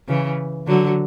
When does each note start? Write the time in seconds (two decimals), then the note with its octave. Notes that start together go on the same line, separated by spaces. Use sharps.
0.08 C#3 E3
0.67 D3 F#3